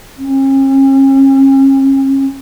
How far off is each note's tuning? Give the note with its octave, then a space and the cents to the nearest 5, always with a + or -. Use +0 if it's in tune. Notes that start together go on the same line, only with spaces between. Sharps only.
C#4 -40